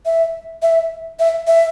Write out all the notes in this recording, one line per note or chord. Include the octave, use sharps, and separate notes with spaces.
E5
E5
E5
E5